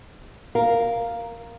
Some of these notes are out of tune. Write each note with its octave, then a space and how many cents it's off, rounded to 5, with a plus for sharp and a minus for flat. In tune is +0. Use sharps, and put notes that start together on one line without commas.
A#4 +0 F5 +0